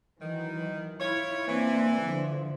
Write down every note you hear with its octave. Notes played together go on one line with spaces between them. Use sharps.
D#3 E3 F#3
E4 F4 C#5
E3 A#3 C4 D4
D3 F3